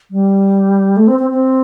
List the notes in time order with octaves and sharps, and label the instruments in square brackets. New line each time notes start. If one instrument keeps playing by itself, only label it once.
[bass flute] G3
A3
C4
C4
C4